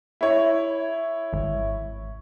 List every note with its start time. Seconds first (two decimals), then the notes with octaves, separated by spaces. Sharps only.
0.21 E4 C#5
1.33 G#1